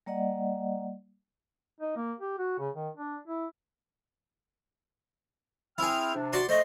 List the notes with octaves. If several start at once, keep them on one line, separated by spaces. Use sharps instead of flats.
G3 A#3 D5 D#5 F#5
D#4
A#3
G4
F#4
C#3
D#3
D4
E4
C4 E4 G#4 G5 F6
C3 D4
F#4 D5 F#5 C6
A3 C5 D#5